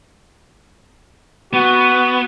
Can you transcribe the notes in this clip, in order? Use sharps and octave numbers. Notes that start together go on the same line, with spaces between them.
B3 F#4